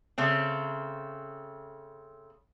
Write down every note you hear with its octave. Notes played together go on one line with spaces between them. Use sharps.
C#3 A3 C4